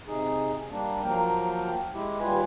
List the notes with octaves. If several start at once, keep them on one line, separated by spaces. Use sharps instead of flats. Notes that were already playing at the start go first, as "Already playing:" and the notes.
C3 D#4 G#4
G3 A#3 D4
F3 F#3 A#3 A#4 G5
G#3 E4 G4
D#2 G3 F4 B4 G#5